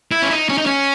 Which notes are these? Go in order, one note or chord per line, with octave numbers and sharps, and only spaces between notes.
E4
C#4
D#4
C#4
D#4
C#4